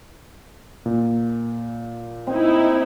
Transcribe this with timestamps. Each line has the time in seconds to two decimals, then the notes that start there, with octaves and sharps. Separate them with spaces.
0.86 A#2
2.27 C4 D#4 E4